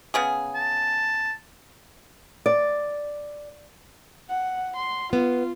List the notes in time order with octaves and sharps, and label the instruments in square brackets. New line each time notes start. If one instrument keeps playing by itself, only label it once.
[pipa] C#3 B3 G#4
[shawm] A5
[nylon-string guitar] D5
[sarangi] F#5
C6
[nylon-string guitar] B3 [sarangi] F4